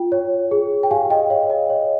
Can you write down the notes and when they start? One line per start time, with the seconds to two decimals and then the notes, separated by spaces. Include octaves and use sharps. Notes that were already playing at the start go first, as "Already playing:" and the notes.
Already playing: F4 G5
0.12 C#5
0.51 G#4
0.83 G5
0.91 G4 F5 G#5
1.10 D#5 G5
1.30 C#5 F5
1.50 D#5
1.70 C#5